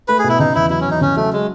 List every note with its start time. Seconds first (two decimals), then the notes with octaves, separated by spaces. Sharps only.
0.08 A3 B4
0.19 G#4
0.24 B2
0.29 E4
0.39 C#3 D#4
0.55 E2 E4
0.70 F#3 E4
0.80 C#4
0.86 E2 D#4
1.01 C#3 C#4
1.16 F#3 A3
1.33 G#3